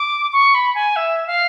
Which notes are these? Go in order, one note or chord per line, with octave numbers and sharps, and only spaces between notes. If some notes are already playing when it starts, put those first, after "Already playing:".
Already playing: D6
C#6
B5
G#5
E5
F5